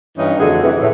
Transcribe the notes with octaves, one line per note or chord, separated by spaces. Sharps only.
G2 E3 C#4 D#4
F2 D3 A3 F#4 G#4
C3 E3
A2